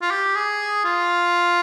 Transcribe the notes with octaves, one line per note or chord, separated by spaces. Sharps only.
F4
G4
G#4
F4